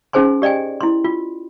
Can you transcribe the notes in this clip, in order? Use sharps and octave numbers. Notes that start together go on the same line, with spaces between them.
C#4 D#4 G#4 C5 G#5 C6
G4 D5 D#5 G5 G#5
E4 C6
F4